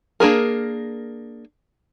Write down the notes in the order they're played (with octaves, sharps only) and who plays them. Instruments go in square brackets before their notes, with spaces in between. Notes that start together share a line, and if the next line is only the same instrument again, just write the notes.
[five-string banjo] A#3 D4 G#4 A#4